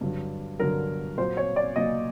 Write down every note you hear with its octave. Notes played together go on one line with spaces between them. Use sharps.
G2 D3 F#3
G2 D3 F#3 A#4
A#2 F#3 A#3 C5
C#5
D5
A#2 F#3 A#3 D#5